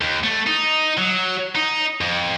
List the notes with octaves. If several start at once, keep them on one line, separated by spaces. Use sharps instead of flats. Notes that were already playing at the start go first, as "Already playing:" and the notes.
D#2
A3
D#4
F#3
D#4
F2